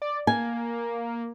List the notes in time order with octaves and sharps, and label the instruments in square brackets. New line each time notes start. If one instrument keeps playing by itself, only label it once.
[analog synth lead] D5
[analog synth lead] A#3 [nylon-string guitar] G#5